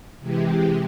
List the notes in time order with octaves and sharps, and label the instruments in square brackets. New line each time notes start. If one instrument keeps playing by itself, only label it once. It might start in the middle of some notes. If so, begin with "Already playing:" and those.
[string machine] C3 E3 G#3 G4